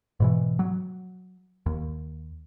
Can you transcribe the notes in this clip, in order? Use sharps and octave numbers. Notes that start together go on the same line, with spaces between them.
G#2 B2 E3
F#3
D#2